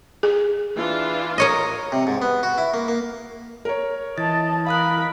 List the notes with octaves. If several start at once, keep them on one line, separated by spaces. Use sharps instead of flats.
G#4
E3 D4 F4
A#4 C#5 D#5
C3
G#2
B3
F#4
E4
A#3
A#3
A#4 C#5
E3 D#5 A5 A6
A#4 F5 B5 D#6 F#6